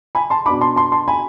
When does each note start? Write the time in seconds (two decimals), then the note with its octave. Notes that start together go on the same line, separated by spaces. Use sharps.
0.15 G#5 B5
0.30 A5 C6
0.46 B2 B3 D4 B5 D6
0.61 A5 C6
0.76 A5 C6
0.92 A5 C6
1.08 G#5 B5